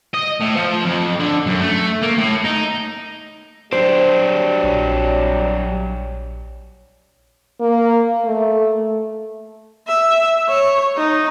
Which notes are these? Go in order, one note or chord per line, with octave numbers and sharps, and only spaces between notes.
D#5
A2
F3
F2
D3
F#2
A3
A#3
A2
D#4
F#3 G3 D4 C5
A#1 C#5
A#3
A3
E5
C#5
D#4